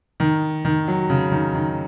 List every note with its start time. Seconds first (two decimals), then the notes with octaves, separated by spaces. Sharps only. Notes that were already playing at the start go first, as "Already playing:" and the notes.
0.20 D#3
0.65 D#3
0.88 F#3
1.10 C#3
1.31 D#3
1.54 D#3